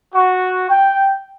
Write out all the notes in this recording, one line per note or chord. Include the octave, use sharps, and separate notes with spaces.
F#4
G5